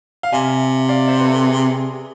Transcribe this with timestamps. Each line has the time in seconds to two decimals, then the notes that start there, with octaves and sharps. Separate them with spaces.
0.23 F5
0.33 C3 E5 G#5
0.89 D5 F5
1.08 C5 E5
1.20 B4
1.25 A4
1.45 G#4